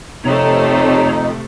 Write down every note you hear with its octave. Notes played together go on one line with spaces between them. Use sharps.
F2 C3 A3 D#4 C#5 A#5